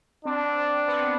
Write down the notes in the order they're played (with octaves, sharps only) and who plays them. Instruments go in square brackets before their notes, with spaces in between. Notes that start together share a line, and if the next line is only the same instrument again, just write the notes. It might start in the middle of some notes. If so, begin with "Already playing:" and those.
[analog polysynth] C4 [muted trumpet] D4
[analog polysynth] B3
C4